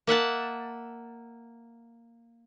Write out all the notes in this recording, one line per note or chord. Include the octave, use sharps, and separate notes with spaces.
A#3 E5 F#5 A5